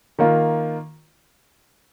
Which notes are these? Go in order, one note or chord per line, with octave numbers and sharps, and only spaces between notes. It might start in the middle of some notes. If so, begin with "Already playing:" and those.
D#3 A#3 F4